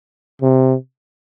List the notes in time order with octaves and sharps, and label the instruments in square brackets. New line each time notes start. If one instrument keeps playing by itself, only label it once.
[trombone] C3